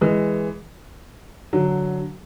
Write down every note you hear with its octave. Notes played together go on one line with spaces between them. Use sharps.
E3 G#3
D3 F#3